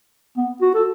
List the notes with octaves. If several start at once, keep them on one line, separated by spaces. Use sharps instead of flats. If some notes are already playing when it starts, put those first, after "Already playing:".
B3
F#4
A4